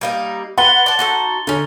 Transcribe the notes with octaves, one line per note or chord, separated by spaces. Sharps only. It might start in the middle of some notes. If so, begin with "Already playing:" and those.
G3 A#3 D#4
B4 F#5 C6 A6 G7
D5 A5
D#4 F#4 A4
D3 C#4 D#4